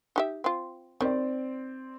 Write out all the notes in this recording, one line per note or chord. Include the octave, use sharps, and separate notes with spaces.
D#4 G4 E5
C4 F4
D#3 G3 C4 D5